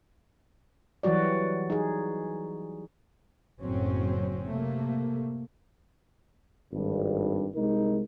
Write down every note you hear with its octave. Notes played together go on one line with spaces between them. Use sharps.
E3 F#3 G3 F#4 D5
D#4 G#4
F#1 A2 F#3 C4 C#4
C3 A3 A#3
G#1 G2
C2 G#3 D#4 A#4